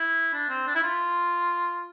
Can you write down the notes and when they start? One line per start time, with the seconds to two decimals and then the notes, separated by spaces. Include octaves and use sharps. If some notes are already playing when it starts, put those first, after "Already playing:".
Already playing: E4
0.34 D4
0.49 C4
0.67 D4
0.75 E4
0.83 F4